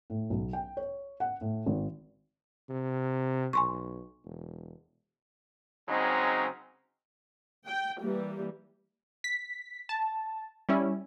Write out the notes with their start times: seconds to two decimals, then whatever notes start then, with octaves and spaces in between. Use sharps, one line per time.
0.10 A2
0.30 B1
0.53 G5
0.77 C#5
1.20 F#5
1.41 A2
1.66 G#1
2.70 C3
3.53 B1 G#5 C6 C#6
4.25 E1
5.88 C#3 F#3 G#3 C4 D#4
7.66 G5
8.00 E3 G3 A#3
9.24 B6
9.89 A5
10.69 G3 C#4 E4